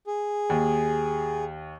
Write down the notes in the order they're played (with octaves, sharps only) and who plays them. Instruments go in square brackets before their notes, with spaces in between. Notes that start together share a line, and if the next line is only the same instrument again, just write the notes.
[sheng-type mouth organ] G#4
[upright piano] D#2